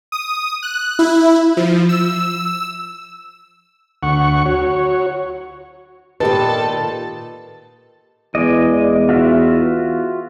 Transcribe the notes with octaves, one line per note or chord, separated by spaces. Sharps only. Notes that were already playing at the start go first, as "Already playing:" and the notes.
D#6
F#6
E4
F3
E6
D2 F#5 C#6
F#4 C#5
A#2 D#3 G4 A4 B4
E2 G#3 D5 D#5
F4 F#4 E5